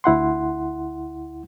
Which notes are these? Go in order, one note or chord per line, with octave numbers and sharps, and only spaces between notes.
D2 E4 F#5 C6